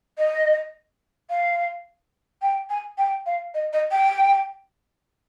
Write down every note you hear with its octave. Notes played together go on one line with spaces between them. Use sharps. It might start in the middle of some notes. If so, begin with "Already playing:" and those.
D#5
F5
G5
G#5
G5
F5
D#5
D#5
G5